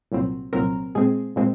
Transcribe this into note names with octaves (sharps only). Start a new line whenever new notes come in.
C2 A#2 F#3 C4
C2 A#2 F#3 C4 A#4
A#2 G#3 C4 G#4
A#2 G#3 C4